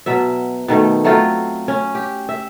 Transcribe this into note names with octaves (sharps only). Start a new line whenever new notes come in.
B2 F#3 E5
B2 D#3 A3
F#3 A3 C4 F4
C#4
G4
E5